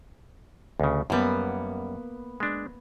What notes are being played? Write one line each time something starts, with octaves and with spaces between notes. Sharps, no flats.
D2 C#3
F#2 G3 A#3 B3
G#3 D4